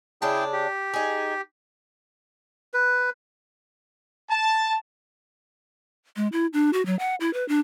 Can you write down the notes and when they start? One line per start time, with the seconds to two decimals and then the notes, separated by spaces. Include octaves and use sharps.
0.22 C#3 D4 E4 G#4 G5 A5
0.53 G4
0.94 D#4 G#4
2.74 B4
4.30 A5
6.16 G#3
6.32 E4
6.53 D4
6.73 F#4
6.86 F#3
6.99 F#5
7.20 E4
7.33 B4
7.49 D4